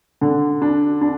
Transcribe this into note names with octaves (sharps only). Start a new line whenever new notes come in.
D3
D4
D4